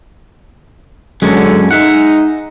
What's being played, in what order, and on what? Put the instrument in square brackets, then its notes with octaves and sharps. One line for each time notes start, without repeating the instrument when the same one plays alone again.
[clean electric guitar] F#2 G#3 C#4 [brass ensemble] D3
[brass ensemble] G#3 D#4 [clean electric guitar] E5 F#5